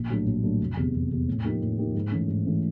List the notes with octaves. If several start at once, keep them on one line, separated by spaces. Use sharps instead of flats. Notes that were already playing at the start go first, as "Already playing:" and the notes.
Already playing: A#1
A2 F#3 A3 D4
A#1
A2 F#3 A3 D4
F1
E2 C3
F1
E2 C3
A2
F3 A#3 D#4 G4
A2
F3 A#3 D#4 G4
G#2
E3 A3 C#4
G#2
E3 A3 C#4